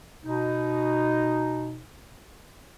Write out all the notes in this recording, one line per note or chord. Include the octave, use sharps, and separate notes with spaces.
B2 D#4